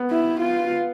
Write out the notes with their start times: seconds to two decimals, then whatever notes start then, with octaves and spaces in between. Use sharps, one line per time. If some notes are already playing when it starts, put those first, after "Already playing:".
Already playing: B3
0.11 E4
0.41 F4